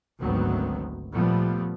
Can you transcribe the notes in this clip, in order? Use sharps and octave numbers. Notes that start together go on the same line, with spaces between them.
G#1 D2 D#3 F#3 B3 C4
A#2 F3 G3 A3 B3